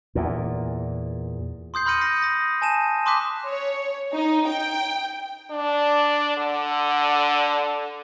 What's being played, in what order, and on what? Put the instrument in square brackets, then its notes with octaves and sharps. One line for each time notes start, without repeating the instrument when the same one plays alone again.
[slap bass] E2 A#2
[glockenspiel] C6 D#6 G6 C7
B5 C6 F6 A#6 C#7 D#7
D#6 A#6 C7 D#7
D#6 A#6
G#5 A5 D#7 E7
A5 C6 D6 D#6 F#6 B6
[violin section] C#5
D#4
G5
[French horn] D4
D3